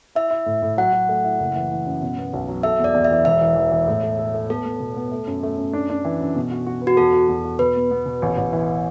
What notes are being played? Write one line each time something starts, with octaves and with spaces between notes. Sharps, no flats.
E4 E5
E4
A2
A2
F#3 F#5
F#3
A3
E4
F#1
E3
E3
F#2
B2
B3
B1
F#3
A4 E5
E2
D5
E2
E5
E3
E1 E5
E3
E3
E3
A2
A4
A4
A3
B3 A4
B3
B2
B3
A3
F#2
A3
F#2
D4
D4
E3
F#2
B2
F#4
F#4
B4
F#4
E2 A4
F#4
E2
F#4
B2 B4
B3
B3
B2
A1
A1
E3